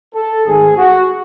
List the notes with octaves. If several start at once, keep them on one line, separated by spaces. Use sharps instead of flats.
A4
G#1 G#2 D#3 A3 G#4
F#4